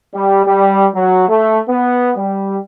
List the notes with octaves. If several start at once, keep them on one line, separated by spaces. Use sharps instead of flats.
G3
G3
F#3
A3
B3
G3